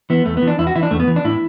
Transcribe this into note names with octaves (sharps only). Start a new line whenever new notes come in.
E3 B3
E2 A3
B3
E3
D4
E2 E4
F#4
E3 E4
D4
E2 A3
B3
E3
D4
A2 E4